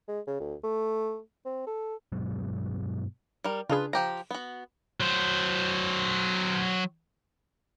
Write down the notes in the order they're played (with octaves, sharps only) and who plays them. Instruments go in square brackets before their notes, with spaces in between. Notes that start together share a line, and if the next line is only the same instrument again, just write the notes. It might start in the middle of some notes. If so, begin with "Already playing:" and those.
[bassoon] G#3
C#3
D2
A3
C4
A4
[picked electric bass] G2 B2 F#3 G#3
[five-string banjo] G3 A#4
[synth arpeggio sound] C#3 D4 G#4 [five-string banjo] F4 B4
[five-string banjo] F3 G4 A#5
B3 F#4
[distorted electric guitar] F#3 C5